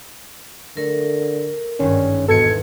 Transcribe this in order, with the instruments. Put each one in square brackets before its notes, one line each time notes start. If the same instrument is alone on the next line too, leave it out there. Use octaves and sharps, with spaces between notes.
[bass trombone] D3 [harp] A3 [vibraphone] A#4
[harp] G#1 G2 [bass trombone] C#4
[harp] E2 G#2 [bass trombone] B2 [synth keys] A4 G#6 C#7